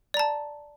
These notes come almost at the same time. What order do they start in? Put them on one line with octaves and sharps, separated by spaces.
D5 A#5 A5